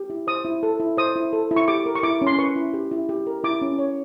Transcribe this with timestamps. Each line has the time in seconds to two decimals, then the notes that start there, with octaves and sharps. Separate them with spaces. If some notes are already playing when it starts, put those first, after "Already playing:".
Already playing: G4
0.10 E4
0.27 C5 D#6
0.45 E4
0.63 A4
0.80 E4
0.97 C5 D#6
1.16 E4
1.33 A4
1.51 E4
1.56 C#6
1.68 G4 D6
1.86 A#4
1.95 C#6
2.03 E4 D6
2.22 C#4
2.27 C6
2.38 B4 C#6
2.56 E4
2.74 G4
2.91 E4
3.09 G4
3.27 A#4
3.44 E4 D6
3.62 C#4
3.79 C#5